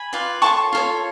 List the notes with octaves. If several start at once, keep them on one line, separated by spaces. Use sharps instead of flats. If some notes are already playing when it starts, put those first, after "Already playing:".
Already playing: G#5 B5
F4 B4 D5
F4 A4 C#5 A5 C#6
F4 A4 C#5